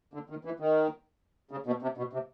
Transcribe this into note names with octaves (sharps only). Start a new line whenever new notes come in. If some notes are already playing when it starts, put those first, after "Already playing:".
D3
D#3
E3
D#3
C#3
B2
C3
B2
C3